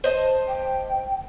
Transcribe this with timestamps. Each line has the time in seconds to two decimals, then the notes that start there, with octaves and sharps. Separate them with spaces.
0.04 C5 D#5 A5
0.48 G5